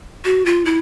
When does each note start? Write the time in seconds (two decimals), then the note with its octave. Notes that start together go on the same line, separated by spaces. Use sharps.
0.25 F#4
0.46 F4
0.65 E4